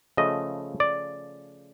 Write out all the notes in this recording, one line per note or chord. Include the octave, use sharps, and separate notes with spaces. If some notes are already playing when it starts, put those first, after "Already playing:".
C#3 F3 A3 D#5
D5